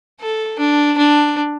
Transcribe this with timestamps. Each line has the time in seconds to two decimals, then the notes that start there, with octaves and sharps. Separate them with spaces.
0.20 A4
0.59 D4
0.98 D4